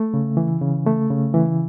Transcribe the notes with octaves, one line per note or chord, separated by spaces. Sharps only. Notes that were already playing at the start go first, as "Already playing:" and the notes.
Already playing: A3
C#3
E3
C#3
A3
C#3
E3